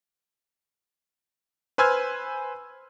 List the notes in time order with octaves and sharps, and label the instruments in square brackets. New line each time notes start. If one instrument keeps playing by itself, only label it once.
[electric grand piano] B4 C5 G#5 E6 F6 G#6